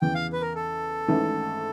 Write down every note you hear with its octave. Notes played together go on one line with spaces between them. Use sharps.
E2 C#3 E3 G5
F5
B4
A#4
A4
G#1 G#2 E3 A3 C#4